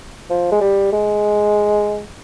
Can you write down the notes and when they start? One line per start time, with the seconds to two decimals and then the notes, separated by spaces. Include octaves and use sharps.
0.30 F3
0.51 G#3
0.61 G3
0.92 G#3